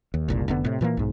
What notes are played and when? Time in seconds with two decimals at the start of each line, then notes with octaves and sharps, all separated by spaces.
0.14 D#2
0.28 F#1 C2 A#2
0.48 F1 D3 B3
0.64 A2 C3
0.81 A#2 E3 F3 A#3
0.97 B1 G#2